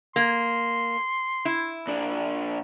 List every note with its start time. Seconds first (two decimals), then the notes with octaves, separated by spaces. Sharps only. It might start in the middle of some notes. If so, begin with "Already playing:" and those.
0.16 A#3 C6
1.45 E4
1.87 A#2 D4